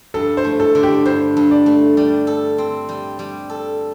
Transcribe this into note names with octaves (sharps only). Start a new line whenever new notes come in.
G2 A4
C5
A3
A4
D3
G4
G2 C5
G2
D5
A3
G3 D5
A4
C4
G3
G3
A4